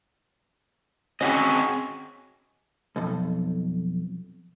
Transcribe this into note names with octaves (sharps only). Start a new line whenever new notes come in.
C4 C#4 F#4 G#4 D#5
B1 F2